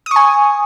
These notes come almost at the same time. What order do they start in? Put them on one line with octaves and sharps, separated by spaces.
D#6 C#6 G#5